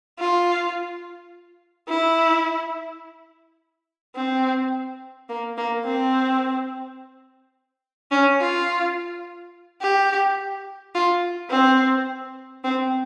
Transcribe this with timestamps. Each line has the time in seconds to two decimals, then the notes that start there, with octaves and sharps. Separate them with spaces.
0.19 F4
1.89 E4
4.15 C4
5.29 A#3
5.58 A#3
5.85 C4
8.12 C#4
8.40 F4
9.82 G4
10.95 F4
11.51 C4
12.64 C4